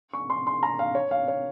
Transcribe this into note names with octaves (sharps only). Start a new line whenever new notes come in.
C#6
C6
C6
A#5
F5
C#5
F5
C#5